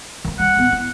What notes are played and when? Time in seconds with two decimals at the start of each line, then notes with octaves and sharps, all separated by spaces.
0.25 D#3 F3
0.39 G3 F#5
0.57 D1 B3
0.72 E4